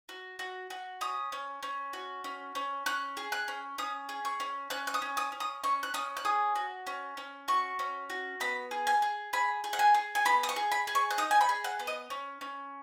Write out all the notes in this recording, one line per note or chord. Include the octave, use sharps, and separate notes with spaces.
F#4
F#4
F#4
C#4 D#6
C#4
C#4
F#4
C#4
C#4
C#4 F#6
G#4
F#6
C#4
C#4 D#6
G#4
C#6
C#4
C#4 F#6
F#6
D#6
C#4
D#6
C#4
D#6
C#4 C#6
F#6
C#4 D#6
F#6
G#4 D#6
F#4
C#4
C#4
F#4 C#6
C#4
F#4
B3 B5
G#4
G#5
G#4
G#4 B5
G#4
F#5
G#5
G#4
G#5
B3 B5
D#6
C#6
G#4
B5
G#4
C#6
F#6
D#4 D#6
G#5
B5
G#4
F#5
B3
D#5
C#4
C#4